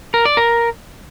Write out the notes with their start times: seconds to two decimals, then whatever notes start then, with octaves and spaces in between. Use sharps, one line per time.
0.14 A#4
0.25 D5
0.37 A#4